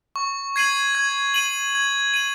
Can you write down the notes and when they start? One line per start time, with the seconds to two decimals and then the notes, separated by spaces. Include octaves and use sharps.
0.16 C#6
0.56 G#6 C7 D#7 F#7
0.95 G#6
1.34 D#7 F#7
1.75 G#6
2.14 D#7 F#7